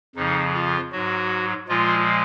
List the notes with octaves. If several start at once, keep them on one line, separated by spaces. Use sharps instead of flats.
F2 C#3 F3 D#4
F4
G#2 F#3 F#4
A#2 F3 G#3 F4